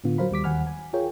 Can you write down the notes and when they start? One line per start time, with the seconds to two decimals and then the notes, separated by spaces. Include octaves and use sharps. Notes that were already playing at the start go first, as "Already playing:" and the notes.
0.04 A2 D3 B3 F4
0.18 F#3 A#4 C5 F5 B5
0.31 D#2 G3 D6 B6
0.44 D#2 F#5 G#5 B5 F6
0.67 G#5
0.93 F4 G#4 A#4 C#5 G5